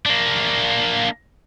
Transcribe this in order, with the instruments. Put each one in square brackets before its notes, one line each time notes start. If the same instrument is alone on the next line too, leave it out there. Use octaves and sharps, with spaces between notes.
[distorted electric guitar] A#3 D4